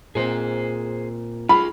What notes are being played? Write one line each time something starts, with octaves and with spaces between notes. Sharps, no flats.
A#2 C4 G#4 C5
F4 G#4 B5